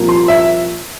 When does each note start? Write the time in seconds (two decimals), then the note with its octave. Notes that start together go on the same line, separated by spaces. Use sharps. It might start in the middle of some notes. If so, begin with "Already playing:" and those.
Already playing: C2 A#2 F3 A#3
0.09 C6
0.28 E5